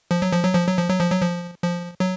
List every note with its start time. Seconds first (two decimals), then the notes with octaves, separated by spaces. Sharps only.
0.11 F3
0.22 F#3
0.33 F3
0.44 F#3
0.55 F3
0.67 F#3
0.77 F3
0.89 F#3
1.00 F3
1.11 F#3
1.22 F3
1.63 F3
2.00 F#3